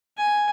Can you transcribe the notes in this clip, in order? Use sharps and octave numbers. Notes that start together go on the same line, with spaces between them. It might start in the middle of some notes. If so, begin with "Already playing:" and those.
G#5